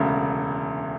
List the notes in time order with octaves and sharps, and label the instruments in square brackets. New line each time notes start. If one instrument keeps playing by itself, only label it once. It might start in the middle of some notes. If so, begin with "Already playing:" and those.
Already playing: [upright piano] E1 D2 C#3